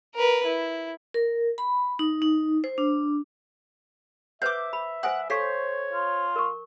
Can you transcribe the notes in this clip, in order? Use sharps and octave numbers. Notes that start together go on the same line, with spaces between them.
A#4 B4
E4
A#4
B5
D#4
D#4
C5
D4
B4 C5 E5 F#5 D6 G6
B5
C5 F#5 G#5 D#6
A4 C5 C#5 F5 C#6
F4
A#4 C#6